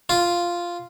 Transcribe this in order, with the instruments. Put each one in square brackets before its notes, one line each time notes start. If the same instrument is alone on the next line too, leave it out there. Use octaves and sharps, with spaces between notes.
[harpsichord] F4